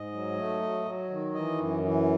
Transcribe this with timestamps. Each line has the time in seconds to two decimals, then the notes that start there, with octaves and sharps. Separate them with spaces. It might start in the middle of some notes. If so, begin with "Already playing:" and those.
Already playing: G#2 D#5
0.13 F#3
0.38 A3
0.62 F#3
0.86 F#3
1.10 D#3
1.34 E3 D#5
1.59 F#2
1.83 E3